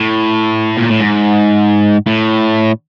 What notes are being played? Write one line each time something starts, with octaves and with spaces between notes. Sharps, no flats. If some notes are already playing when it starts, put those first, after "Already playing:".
Already playing: A2
A#2
A2
G#2
A2